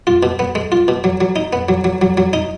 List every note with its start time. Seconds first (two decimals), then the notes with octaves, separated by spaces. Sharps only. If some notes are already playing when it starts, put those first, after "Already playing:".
0.07 F4
0.23 B2
0.39 B3
0.55 G#3
0.72 F4
0.88 B2
1.04 F#3
1.21 F#3
1.36 D#4
1.53 B3
1.69 F#3
1.84 F#3
2.02 F#3
2.17 F#3
2.33 D#4